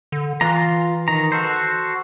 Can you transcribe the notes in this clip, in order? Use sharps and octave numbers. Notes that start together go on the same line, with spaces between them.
D3
E3 F4 A#5
D#3 A#5
F#4 A4 C5